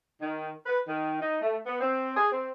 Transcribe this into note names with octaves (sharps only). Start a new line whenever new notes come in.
D#3
B4
D#3
D#4
A3
B3
C4
G#4
C4